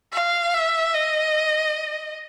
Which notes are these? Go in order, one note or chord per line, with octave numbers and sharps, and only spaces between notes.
F5
E5
D#5